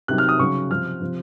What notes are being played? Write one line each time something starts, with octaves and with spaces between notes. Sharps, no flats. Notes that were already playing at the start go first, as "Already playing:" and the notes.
C3 D#3 F#3 F#6
F6
D#6
C#3 F#3 C#6
C3 F3 F6
C3 F3